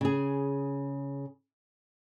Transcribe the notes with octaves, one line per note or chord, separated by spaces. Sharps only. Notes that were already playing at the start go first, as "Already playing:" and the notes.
C#3 G#4